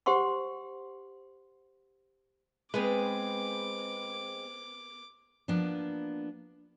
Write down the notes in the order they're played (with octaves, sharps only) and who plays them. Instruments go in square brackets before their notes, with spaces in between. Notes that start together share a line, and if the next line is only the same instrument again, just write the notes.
[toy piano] G4 C5 F#5 C6 C#6
[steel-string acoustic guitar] G#3 C4 [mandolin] B3 G#4 B4 [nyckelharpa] D6
[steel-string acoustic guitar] F3 A#3 B3 D4